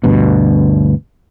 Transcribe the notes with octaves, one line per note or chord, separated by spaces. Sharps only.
D2 G2 B2